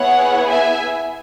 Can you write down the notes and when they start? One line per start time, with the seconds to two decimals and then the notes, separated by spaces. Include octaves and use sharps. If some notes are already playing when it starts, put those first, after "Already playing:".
Already playing: B3 E4 G#4 C#5 F#5
0.49 E5 G#5